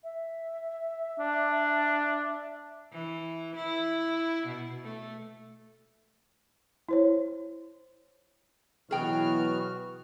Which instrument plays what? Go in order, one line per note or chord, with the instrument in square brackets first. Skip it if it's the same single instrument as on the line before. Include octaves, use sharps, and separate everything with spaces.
[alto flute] E5
[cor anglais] D4
[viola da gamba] E3
E4
B2
A3
[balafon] E4 C5 C#5
[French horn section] B2 E3 F#3 [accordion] B3 F#4 F6 [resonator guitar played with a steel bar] G#4 G5